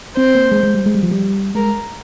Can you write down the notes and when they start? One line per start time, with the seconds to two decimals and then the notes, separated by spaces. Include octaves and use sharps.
0.17 C4 C5
0.35 A#3
0.52 G#3
0.63 G#3
0.75 G3
0.86 G#3
0.95 G3
1.03 F3
1.11 G3
1.55 G#3 A#4